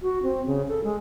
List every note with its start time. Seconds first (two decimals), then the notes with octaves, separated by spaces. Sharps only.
0.02 F#4
0.23 C4
0.47 C#3
0.68 A4
0.84 G#3